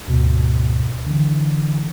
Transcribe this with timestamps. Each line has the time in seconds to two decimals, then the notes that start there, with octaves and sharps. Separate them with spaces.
0.08 D2 G#2 B2
1.07 D3 E3